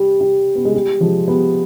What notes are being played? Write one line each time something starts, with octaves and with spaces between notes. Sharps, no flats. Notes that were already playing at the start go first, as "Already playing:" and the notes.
Already playing: G3
G3
B3
G#3
G3
F3 G#3
G3 B3